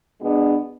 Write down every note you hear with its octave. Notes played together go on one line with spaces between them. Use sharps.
B2 G#3 B3 D4